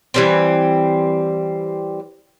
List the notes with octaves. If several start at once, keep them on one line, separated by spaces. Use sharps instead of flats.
E3 G3 C4